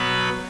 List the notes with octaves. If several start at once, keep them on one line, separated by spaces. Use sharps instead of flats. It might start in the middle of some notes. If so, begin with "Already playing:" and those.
Already playing: B2 F#3 B3 B4 B5